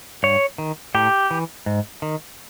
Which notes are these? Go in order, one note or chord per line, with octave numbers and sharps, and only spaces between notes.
G2 C#5
D#3
A2 G4
E3
G#2
D#3